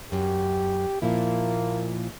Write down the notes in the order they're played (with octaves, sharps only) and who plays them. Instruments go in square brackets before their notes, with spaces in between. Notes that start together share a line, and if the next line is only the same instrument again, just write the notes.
[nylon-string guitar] F#2 [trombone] G4
[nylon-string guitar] A#2 F3 E4 [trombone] A#3